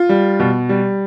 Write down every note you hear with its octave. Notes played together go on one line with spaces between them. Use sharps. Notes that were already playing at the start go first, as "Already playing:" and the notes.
Already playing: F4
G3
B2
G3